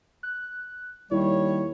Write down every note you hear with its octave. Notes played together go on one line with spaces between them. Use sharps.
F#6
D#2 G3 E4 C#5